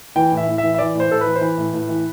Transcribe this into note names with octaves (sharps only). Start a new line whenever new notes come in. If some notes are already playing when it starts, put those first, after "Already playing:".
E3 G5
A2
E5
A2
E5
E3
E5
E3 D5
A2
C5
A2 A4
B4
E3
C5
E3 B4
A2
A2
E3